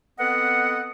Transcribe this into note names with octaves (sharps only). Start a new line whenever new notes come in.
B3 C4 A4 D#5 F#5